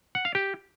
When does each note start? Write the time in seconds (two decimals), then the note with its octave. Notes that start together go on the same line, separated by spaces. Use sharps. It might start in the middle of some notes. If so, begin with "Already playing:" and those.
0.15 F#5
0.25 F5
0.35 G4